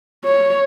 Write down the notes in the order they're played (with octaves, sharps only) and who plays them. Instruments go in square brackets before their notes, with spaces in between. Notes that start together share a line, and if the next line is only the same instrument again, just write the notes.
[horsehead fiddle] C#5